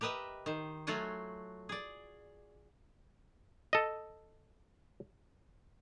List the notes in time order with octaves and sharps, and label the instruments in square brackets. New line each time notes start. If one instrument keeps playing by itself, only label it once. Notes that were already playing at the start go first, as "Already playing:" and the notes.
[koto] G4 A#4 B4 D#5 E5
D#3 C5
F#3 A3 F4 F#4 F#5 G#5
G#4 D5
[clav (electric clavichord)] A4 D#5